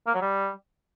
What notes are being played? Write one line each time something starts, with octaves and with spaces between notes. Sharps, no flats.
A#3
F#3
G3